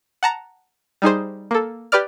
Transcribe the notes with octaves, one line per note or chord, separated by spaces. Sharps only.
F#5 A5 A#5
G3 D#4 G#4 C5
A#3 A4
G4 B4 D5 F6